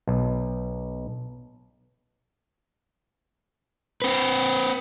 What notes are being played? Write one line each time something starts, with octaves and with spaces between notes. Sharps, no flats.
B1
C4 B4